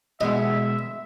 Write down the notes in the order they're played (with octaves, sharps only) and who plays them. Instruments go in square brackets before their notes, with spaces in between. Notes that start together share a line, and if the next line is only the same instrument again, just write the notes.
[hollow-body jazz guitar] B2 G#3 F#5 [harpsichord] D#5 [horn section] E5